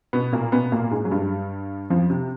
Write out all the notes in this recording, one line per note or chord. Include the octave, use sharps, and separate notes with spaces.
B2 B3
A#2 A#3
B2 B3
A#2 A#3
G#2 G#3
F#3
G2 G3
F2 F3
C3